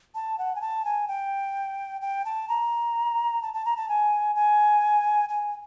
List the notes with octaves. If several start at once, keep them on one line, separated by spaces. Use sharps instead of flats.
A5
F#5
G#5
A5
G#5
G5
G5
A5
A#5
A5
A5
A#5
A5
G#5
G#5
G#5